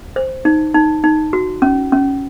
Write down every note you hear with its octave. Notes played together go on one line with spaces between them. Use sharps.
C5
D#4
D#4
D#4
F#4
C#4
C#4